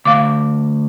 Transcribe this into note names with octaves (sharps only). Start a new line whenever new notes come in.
D2 F5 D6